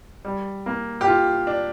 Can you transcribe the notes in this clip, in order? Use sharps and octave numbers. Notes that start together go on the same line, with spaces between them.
G3
A#3
G4
F4
D4